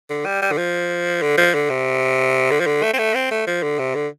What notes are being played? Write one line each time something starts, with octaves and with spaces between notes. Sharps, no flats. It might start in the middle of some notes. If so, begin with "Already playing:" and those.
D3
G3
G3
D3
F3
D3
F3
D3
C3
D3
F3
D3
A3
C4
A3
C4
A3
F3
D3
C3
D3